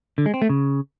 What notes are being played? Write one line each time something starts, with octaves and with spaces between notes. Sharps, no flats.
D3
G#3
C4
A3
C#3